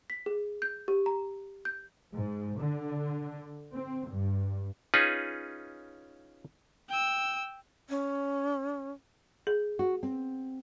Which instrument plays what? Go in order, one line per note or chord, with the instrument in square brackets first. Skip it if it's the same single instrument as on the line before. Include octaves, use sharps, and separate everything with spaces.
[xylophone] B6
G#4
G6
G4
A#5
G6
[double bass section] G#2
D3
C4
G2
[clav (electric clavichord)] C#4 D#4 F4 G#4 B4
[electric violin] G5 E6
[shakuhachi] C#4
[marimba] G#4
[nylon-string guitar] F#4
C4